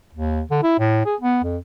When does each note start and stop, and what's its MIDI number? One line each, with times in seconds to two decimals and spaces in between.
0.13 0.42 39
0.51 0.60 50
0.63 0.78 64
0.79 1.03 45
1.06 1.15 68
1.21 1.41 59
1.44 1.57 41